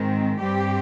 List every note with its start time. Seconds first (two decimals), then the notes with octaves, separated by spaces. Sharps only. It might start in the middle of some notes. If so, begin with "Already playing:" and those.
Already playing: G#2 D#3 G#3 C4
0.40 G2 G3 C4 G4